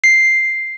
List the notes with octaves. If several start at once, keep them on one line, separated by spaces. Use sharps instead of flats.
C7